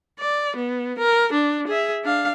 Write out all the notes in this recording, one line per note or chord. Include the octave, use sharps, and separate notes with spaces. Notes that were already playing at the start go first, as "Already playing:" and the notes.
D5
B3
A#4
D4
G#4 E5
D4 F5